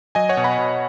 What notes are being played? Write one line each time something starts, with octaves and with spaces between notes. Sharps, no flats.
F#3 D#5 G#5
C#5 F#5
B2
F#5 B5
B2